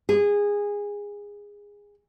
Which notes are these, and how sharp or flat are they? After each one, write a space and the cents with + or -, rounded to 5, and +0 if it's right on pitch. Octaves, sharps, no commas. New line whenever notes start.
G#4 -20